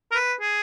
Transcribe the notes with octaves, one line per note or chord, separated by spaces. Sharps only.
A#4
B4
G#4